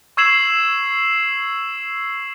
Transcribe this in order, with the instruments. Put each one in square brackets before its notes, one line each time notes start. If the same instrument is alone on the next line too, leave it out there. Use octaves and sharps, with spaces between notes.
[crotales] C#6 E6 G#6 C7 E7 F#7